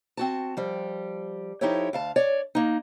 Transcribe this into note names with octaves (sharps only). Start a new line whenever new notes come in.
C4 F#4 A5
F3 G3
F3 D#4 E4 G4 A4 C#5
D2 F5 A5
C#5 D5
A#3 D#4